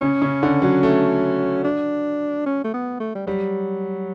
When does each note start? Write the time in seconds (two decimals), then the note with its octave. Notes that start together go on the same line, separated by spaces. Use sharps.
0.01 C#3 C#4
0.22 C#3
0.43 D3
0.62 F#3
0.83 A3
1.64 D4
2.46 C#4
2.64 A3
2.73 B3
3.00 A3
3.15 G3
3.27 F#3 G3